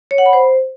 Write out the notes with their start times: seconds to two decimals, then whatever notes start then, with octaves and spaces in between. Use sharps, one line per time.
0.11 C#5
0.18 F#5
0.26 B5
0.33 C5